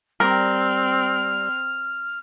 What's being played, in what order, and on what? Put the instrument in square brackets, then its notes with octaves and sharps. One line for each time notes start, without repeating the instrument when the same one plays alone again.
[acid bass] G3 [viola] C4 [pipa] A#4 [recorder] F6